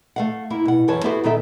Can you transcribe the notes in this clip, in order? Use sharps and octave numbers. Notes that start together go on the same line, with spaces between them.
A3 F5 F#5
A#3 E4
B2 F#5
F#2 E3 B4 C#5 A5
B3 E4 F#4 G4 A4 C5
A#2 D#3 B3 D#4 A4 E5